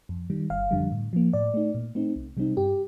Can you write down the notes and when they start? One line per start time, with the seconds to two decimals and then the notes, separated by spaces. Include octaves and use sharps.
0.09 F2
0.30 D#3 G3
0.50 G1 F5
0.71 F2 D3 G3
0.92 A2
1.13 F3 A#3
1.33 A2 D5
1.54 A3 D#4
1.74 A#2
1.95 A3 C4 D#4
2.16 C2
2.37 C3 G3 C4 D#4
2.57 G2 G4